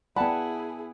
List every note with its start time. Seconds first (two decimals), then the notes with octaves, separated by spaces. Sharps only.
0.16 B3 E4 G#4 D5 F#5 G5 A5 B5